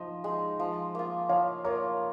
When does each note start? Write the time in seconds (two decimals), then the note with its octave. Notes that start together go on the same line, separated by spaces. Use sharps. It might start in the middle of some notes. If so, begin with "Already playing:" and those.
Already playing: F3 D#4 D#5
0.24 G#3 D#4
0.59 F3
0.95 A#3 F4
1.29 F3 C#5 F5
1.64 A#3 F4 A#4 C#5